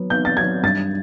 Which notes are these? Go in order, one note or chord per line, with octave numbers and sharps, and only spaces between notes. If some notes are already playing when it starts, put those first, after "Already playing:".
Already playing: F#3 B3
B3 G6
A6
F#3 G#6
G2 A6